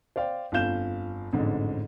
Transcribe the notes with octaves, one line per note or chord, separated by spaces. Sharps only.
C5 D5 F5 G5
G1 F2 F3 F5 G6 E7
A1 F2 G#2 D3